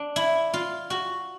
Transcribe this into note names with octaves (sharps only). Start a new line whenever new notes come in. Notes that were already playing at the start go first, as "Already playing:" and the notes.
Already playing: D4
E4
F4
F#4